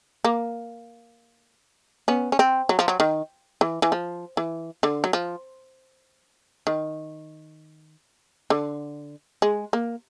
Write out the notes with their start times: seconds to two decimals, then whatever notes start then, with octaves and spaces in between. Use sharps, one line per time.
0.25 A#3
2.08 B3 C#4
2.32 C#4
2.39 C4
2.69 F#3
2.79 F3
2.88 F#3
3.00 D#3
3.61 E3
3.82 E3
3.92 F3
4.37 E3
4.83 D3
5.04 F#3
5.13 F3
6.67 D#3
8.50 D3
9.42 G#3
9.73 A#3